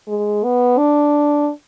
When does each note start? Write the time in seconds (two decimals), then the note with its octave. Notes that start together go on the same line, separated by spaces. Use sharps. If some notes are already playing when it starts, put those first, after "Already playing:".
0.08 G#3
0.44 B3
0.78 D4